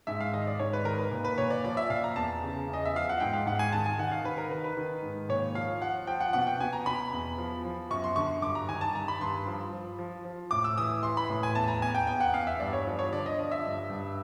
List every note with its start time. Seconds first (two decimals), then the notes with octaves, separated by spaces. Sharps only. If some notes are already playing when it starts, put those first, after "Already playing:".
0.07 G#2 E5
0.20 F5
0.34 D#3 D#5
0.47 D5
0.59 G#2 C#5
0.73 B4
0.85 D#3 A#4
0.98 B4
1.11 A#2
1.25 B4
1.38 A#2 C#5
1.50 D5
1.65 F3 D5
1.77 E5
1.90 A#2 F5
2.04 A#5
2.16 E2 A5
2.43 C#3
2.68 E2
2.73 D#5
2.85 E5
2.95 F3 F5
3.09 F#5
3.20 G#2 G5
3.33 F5
3.46 G#2 F#5
3.59 G#5
3.72 D#3 A5
3.86 G#5
3.99 D#3 F#5
4.11 F5
4.24 D#3 B4
4.38 A#4
4.51 D#3 B4
4.64 B4
4.77 D#3
5.03 G#2
5.29 A#2 C#5
5.55 F3 F5
5.82 F3 F#5
6.07 F3 G5
6.21 F#5
6.33 B2 F#5
6.47 G5
6.60 B2 G#5
6.73 A#5
6.86 B2 B5
7.13 E2
7.38 F3
7.65 F3
7.90 F#2 C#6
8.04 C6
8.16 D3 C#6
8.42 G2 D6
8.55 A#5
8.69 D#3 G#5
8.81 A5
8.95 G2 A#5
9.08 B5
9.21 G2 C6
9.47 F3
9.73 F3
9.99 F3
10.25 F3
10.51 A2 D6
10.64 E6
10.78 E3 D#6
11.03 E3 C6
11.17 B5
11.30 A2
11.43 G#5
11.55 E2 A5
11.68 A#5
11.82 E2 G#5
11.95 G5
12.07 E2 G5
12.20 F#5
12.33 E2 F5
12.47 E5
12.60 G2 D5
12.73 C#5
12.87 F3
12.99 C#5
13.12 D3 D5
13.26 D#5
13.39 F3 D#5
13.51 E5
13.65 G2
13.90 G2